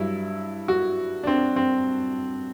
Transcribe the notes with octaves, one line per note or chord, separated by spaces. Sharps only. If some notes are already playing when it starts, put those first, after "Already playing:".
Already playing: G2 F#3 E4
F#4
D4
C4
C4